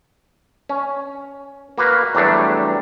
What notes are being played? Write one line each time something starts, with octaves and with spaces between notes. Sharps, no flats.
C#4
A#3 F#4 B4 F5
E2 F#3 G3 A3 D4